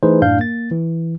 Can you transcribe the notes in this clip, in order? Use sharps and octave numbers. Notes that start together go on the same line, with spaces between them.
E3 A3 D#4 G#4 B4 C5
F#2 A2 D4 F5 G6
A#3 A6
E3